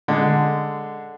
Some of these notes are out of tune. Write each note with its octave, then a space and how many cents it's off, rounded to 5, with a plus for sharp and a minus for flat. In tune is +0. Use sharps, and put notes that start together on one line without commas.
D3 +0 G#3 -5